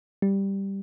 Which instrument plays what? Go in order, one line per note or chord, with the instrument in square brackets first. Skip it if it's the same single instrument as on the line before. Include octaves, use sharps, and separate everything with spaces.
[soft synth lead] G3